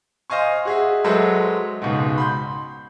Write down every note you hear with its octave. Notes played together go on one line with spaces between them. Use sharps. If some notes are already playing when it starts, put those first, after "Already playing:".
C5 D#5 F5 G#5 C#6
F#4 G#4 E5
F#3 G#3 A4 B4 C5 E5
C#2 G#2 B2
B5 C6 G6